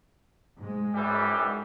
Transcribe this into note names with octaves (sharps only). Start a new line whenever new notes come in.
G#2 G#3
F#2 E3 G3